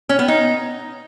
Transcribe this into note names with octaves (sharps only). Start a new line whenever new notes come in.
C#4
B3
D#4